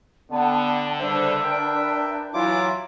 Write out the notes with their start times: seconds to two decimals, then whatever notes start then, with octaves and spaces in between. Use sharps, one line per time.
0.31 D3 B3 D5 G5 A5
0.99 C#3 G3 D4 B4 C5 D5 E5
1.44 A#4 G5
2.34 E3 F#3 E4 F4 D6